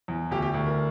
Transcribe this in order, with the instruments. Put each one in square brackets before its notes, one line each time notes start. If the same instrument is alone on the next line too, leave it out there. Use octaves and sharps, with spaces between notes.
[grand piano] E2
D2 G4
G4
D2
A#4